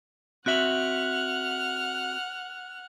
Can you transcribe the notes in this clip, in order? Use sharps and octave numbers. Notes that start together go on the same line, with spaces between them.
C4 F#4 E5 F#5 F6 F#6 F#7